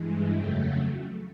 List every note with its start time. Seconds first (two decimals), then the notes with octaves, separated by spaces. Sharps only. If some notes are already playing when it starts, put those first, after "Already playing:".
Already playing: G2 E3 G#3
0.30 F2 C#3 F#3 A3 G5